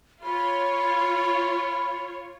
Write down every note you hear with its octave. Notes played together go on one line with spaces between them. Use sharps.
F4 C#5 B5